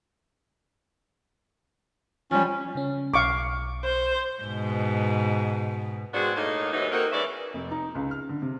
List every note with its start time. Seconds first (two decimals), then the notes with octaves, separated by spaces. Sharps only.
2.31 F3 G3 C#4
2.75 C#3 C#4
3.14 B1 F5 C#6 D6
3.84 C5
4.43 G#2 B2
6.14 G#3 B3 C4 D4 F#4
6.35 A2 A#3 D#4
6.72 D#2 G#2 E3 F#3 D#4
6.91 A#3 C4 D#4 F#4 A4 A#4
7.12 E3 G#3 C#4 D5 E5
7.54 F1
7.71 D#4
7.95 C#2
8.11 F6
8.29 D3
8.42 C3